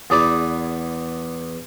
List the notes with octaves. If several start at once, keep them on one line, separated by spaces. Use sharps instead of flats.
E2 G#4 D5 B5